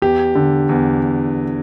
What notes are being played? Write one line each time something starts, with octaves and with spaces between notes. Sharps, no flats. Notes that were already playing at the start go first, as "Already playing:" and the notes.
E2 G4
D3
E2